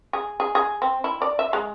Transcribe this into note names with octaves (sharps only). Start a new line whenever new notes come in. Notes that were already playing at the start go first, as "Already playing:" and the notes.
G#4
G#4
G#4
C4
E4
D5
E5
G#3